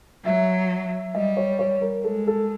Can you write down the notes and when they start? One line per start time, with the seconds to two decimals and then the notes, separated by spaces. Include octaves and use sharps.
0.24 F#3 E5
1.15 G3 D#5
1.37 C#5
1.59 C#5
1.81 A#4
2.04 G#3 A4
2.27 A4